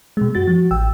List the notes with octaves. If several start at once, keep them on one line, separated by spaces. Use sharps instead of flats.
B2 G#3
F#2 F#4 A6
F3 F#4
A1 G5 E6